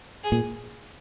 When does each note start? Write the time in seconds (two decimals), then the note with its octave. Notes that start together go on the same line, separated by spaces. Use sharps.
0.24 G#4
0.32 A#2